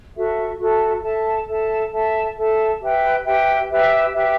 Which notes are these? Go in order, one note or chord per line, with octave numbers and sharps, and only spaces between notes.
F#4 A4 E5
F#4 A4 E5
A4 E5 A5
A4 E5 A5
A4 E5 A5
A4 E5 A5
G4 B4 E5 G5
G4 B4 E5 G5
G4 B4 E5 G5
G4 B4 E5 G5